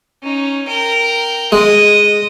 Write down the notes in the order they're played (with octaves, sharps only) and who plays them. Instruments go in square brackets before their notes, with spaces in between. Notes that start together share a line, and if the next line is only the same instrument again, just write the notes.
[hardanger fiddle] C#4 D#4
A#4 G5
[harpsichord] G#3 [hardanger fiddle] D#5